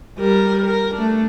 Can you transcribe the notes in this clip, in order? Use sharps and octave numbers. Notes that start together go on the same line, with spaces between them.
G3 A#4
A#4
A3 D4